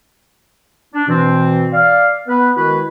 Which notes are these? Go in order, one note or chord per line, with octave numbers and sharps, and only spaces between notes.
D4
B2 E3 C4
D5 F5
B3 B4
D#3 G#3 E4 F#4 B4